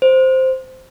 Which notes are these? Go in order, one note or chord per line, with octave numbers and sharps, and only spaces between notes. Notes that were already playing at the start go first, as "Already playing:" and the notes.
C5